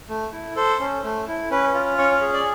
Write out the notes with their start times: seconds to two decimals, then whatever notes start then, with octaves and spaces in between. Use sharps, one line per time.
0.09 A3
0.32 E4
0.56 A4 C5
0.80 C#4
1.04 A3
1.28 E4
1.51 C#4 B4
1.74 F4
1.98 C#4 C#5
2.21 G#4
2.33 D5